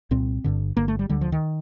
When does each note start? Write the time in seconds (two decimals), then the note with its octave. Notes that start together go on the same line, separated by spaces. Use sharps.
0.11 C2 A#2 C4
0.44 G1 G2 D3
0.77 G1 G2 D3 A#3
0.88 A3
0.99 G3
1.09 D2 D3 G3
1.21 F3
1.32 D#3